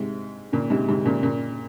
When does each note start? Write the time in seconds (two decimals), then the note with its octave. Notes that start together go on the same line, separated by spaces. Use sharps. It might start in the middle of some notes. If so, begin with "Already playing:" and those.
Already playing: G#2 C3
0.52 A#2 C#3
0.70 G#2 C3
0.89 G#2 C3
1.05 A#2 C#3
1.23 A#2 C#3